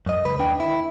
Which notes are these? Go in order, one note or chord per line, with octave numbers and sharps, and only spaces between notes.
F#2 D#5
C#2 B4
D#2 D4 G5
E4